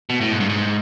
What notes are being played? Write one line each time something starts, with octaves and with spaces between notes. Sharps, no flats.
B2
A2
G#2
G2
G#2